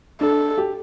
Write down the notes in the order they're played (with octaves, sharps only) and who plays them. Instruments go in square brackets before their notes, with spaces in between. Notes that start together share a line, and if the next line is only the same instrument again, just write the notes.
[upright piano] D4 [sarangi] A4
[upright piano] G4